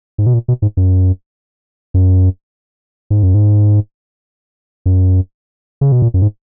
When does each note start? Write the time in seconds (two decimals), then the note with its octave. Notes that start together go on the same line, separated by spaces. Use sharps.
0.18 G#2
0.26 B2
0.34 A#2
0.48 B2
0.62 G#2
0.77 F#2
1.94 F#2
3.10 G#2
3.23 F#2
3.34 G#2
4.86 F#2
5.81 C#3
5.92 B2
6.02 A#2
6.14 F#2
6.22 G#2